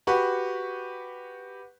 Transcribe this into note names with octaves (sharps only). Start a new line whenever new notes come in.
F#4 G4 B4 C#6